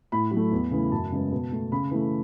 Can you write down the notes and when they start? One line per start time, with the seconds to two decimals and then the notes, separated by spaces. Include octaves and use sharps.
0.12 A2 B5
0.31 F#3
0.37 A3
0.52 E2
0.71 C#3 E3 A3
0.92 F#2 A5
1.12 C#3 G#3 B3
1.32 B2
1.52 A3
1.72 C#3 B5
1.91 E3 A3